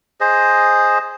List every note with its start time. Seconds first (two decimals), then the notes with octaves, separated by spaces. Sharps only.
0.21 G#4 C5 D#5